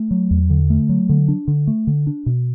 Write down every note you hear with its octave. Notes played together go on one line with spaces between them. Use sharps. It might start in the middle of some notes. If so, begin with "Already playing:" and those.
Already playing: A3
F#3
E2
D3
A3
F#3
D3
D4
D3
A3
D3
D4
B2